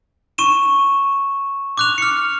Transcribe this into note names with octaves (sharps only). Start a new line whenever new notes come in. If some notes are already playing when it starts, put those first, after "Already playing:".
C#6 D#7 E7
D6 F#6 F7
F6 C#7